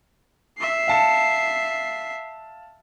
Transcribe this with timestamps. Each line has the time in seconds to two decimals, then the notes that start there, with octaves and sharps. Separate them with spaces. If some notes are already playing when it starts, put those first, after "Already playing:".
0.58 E5 C7
0.88 F5 A5 C#7